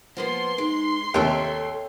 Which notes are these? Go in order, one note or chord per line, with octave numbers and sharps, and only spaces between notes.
F3 A#3 B3 C6
G#3 D#4
D#2 C3 A4 C#5 E5 G5